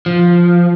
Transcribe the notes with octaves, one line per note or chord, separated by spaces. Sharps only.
F3